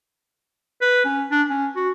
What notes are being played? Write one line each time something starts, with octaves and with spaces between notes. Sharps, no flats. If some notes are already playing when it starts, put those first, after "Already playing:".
B4
C#4
D4
C#4
F#4